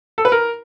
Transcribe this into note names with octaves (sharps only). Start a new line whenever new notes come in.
A4
B4
A#4